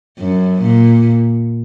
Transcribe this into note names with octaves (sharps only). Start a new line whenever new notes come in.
F#2
A#2